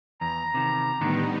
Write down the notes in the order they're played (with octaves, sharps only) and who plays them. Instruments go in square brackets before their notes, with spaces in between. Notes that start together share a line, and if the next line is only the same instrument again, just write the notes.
[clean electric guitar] E2 [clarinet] A#5
[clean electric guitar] C3 D#3
[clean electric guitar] A2 D3 D#3 [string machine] G3 B3 D#4